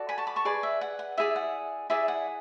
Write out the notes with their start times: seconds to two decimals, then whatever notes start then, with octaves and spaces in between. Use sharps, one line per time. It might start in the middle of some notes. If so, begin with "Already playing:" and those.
Already playing: F#4 A4 D5
0.09 G#5 B5
0.18 A5 C#6
0.27 B5 D6
0.36 A5 C#6
0.45 G#4 B4 D5
0.63 E5
0.81 F#5
0.99 F#5
1.17 E4 G#4 D5 E5
1.36 F#5
1.90 E4 G#4 D5 E5
2.08 F#5